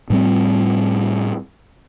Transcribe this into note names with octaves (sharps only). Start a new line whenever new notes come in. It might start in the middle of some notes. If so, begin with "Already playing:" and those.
A2 G3 C4